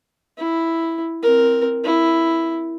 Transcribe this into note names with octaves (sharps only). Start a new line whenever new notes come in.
E4
C4 A#4
E4